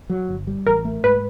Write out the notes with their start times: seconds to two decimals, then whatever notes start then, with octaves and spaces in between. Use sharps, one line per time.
0.10 F#3
0.29 G1
0.47 G3
0.66 A1 A#4
0.85 A3
1.04 G#2 B4